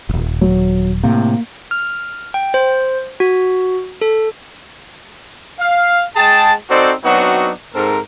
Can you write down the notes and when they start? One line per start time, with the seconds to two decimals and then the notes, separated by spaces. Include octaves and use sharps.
0.09 D#1 G#1
0.41 F#3
1.03 A2 C3 A#3
1.71 F6
2.34 G5
2.54 C5
3.20 F#4
4.01 A4
5.59 F5
6.16 G#3 G#4 G5 A5
6.69 C4 D#4 F#4 A4 C5 D5
7.04 F#3 B3 C4 D4 D#4 F#4
7.75 G#2 C4 A4 A#4